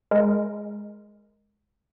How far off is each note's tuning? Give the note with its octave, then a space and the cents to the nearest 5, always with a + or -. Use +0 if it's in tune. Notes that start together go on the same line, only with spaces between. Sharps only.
G#3 +0 A#4 +0